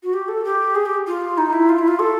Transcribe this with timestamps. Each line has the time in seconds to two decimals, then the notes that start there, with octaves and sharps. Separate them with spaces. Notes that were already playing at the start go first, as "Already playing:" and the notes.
0.03 F#4
0.13 G4
0.28 A4
0.44 G4
0.75 G#4
0.86 G4
1.07 F4
1.38 D#4
1.53 E4
1.69 F4
1.78 E4
1.88 F4
1.99 A4